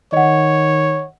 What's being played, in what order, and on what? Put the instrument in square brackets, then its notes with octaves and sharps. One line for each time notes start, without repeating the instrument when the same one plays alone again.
[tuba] D#3 [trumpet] C#5 [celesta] D#5 F#5